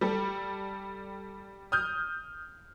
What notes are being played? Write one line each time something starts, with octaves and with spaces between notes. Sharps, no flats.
G3 A4
D#6 F6 G6